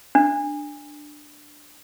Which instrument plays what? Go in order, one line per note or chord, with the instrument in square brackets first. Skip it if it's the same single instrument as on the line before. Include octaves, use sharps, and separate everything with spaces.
[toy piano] D4